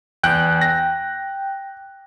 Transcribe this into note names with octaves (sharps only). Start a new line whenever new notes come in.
E2 G5 F#6
A#6